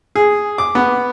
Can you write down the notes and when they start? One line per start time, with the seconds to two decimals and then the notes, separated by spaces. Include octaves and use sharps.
0.15 G#4
0.58 D6
0.75 B3